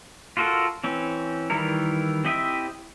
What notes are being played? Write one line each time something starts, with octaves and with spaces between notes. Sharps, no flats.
F4 F#4 A4 A#4
E3 C4 C#4
D#3 E3 G3 E4 A#4
C4 E4 G4 D#5 E5